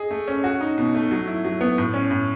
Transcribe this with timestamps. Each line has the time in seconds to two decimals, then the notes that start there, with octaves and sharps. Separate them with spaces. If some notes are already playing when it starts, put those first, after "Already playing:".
Already playing: G#4 D#5
0.10 A3
0.28 C#4
0.44 F#4
0.60 D#4
0.78 B2
0.95 A3
1.11 F#3
1.27 E4
1.45 F#3
1.61 B3
1.78 A2
1.94 C#4
2.11 A2